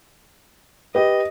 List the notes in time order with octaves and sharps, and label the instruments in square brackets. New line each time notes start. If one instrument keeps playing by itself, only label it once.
[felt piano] G4 B4 [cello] D#5